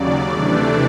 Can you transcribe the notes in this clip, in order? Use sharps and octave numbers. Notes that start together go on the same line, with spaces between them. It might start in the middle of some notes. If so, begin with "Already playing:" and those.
Already playing: D#2 C#3 F#3 D5
C3 E3 A3 D4